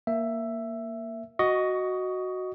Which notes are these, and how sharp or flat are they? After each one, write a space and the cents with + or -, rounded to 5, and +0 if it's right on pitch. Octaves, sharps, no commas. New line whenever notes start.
A#3 +0 E5 +10
F#4 +0 D#5 +0 C#6 +20